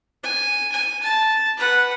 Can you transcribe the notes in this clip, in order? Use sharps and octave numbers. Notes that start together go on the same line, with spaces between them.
G#5
G#5
A5
B4 F#5